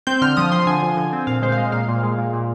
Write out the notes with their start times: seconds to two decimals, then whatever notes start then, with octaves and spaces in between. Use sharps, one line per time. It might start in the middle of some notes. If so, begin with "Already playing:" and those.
0.07 C4 G6
0.22 D3 F6
0.37 F3 D#6
0.52 F3 C6
0.67 D3 G#5
0.83 F3
0.97 D3
1.13 C4
1.27 A#2 F5
1.42 G#3 C5
1.52 F5
1.57 G#3 D#5
1.72 A#2 F5
1.88 A#2
2.03 G#3
2.18 A#2
2.33 A#2